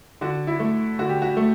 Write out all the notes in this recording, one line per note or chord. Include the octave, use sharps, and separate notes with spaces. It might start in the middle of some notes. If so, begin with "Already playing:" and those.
D3 F#4
E4
A3
D3 F#4
G4
F#4
A3